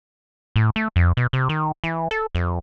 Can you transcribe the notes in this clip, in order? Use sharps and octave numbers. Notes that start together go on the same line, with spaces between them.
A2
A3
F2
B2
C3
D#3
E3
A4
F2